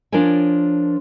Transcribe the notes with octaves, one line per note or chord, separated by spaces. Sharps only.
F3 D4 F4 A#4 C#5 G#5